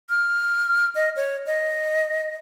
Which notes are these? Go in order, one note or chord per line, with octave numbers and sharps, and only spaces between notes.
F6
D#5
C#5
D#5